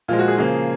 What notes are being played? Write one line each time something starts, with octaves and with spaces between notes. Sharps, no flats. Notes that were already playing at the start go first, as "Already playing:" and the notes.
A#2 F3 G#3 F4
F#4
G#4
C#3 F3 A#3